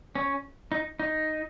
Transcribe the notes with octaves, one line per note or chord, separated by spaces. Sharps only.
C#4
D#4
D#4